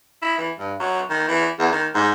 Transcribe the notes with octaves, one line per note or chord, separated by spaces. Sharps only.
E4
E3
G2
F#3
D#3
E3
E2
D#3
G#2